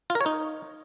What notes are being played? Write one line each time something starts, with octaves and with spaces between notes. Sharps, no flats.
F4
A#4
C#5
D#4